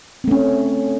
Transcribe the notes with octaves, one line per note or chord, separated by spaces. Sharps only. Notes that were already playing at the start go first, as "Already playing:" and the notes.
A3 C4 C#4